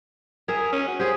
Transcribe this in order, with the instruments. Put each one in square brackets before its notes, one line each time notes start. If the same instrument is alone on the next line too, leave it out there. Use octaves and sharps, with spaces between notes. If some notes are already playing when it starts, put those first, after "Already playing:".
[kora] G#4 E5 [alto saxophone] A#4
[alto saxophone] C#4
F#4
[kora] G4 G#4 [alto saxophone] C5